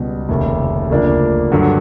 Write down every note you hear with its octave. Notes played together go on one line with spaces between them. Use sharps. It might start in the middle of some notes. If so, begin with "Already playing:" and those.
Already playing: C#2 B2 G3 B3
F1 D#2 C#3
D2 C#3 F3 A#3 D4
G2 D3 F#3